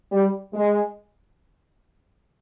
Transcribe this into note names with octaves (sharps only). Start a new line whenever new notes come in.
G3
G#3